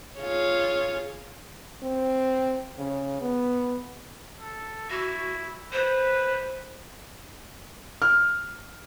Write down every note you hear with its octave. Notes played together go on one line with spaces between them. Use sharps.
F4 G#4 C#5
C4
C#3
B3
A4
E4 F#4
B4 C5
F6